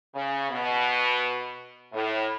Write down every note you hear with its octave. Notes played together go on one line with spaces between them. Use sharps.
C#3
B2
A2